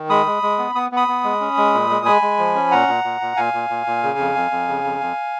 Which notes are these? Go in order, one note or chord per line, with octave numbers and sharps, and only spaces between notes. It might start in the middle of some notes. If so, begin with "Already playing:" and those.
Already playing: D#3
G#3 B5 D#6
G#3
G#3
B3
B3 D#6
B3 B5 D#6
B3
G#3
C#4
G#3
A#2
G#3
G#3 G#5 B5
G#3
F3
C#4
A#2 F#5 A#5
A#2
A#2
A#2
A#2 F5 G#5
A#2
A#2
A#2
C#3
F2
F2
F2
C#3
F2
F2